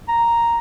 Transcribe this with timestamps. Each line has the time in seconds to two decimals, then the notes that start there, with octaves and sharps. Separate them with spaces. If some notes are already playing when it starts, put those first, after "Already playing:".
0.08 A#5